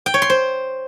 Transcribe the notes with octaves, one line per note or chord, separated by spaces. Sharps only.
G5
C#5
C6
C5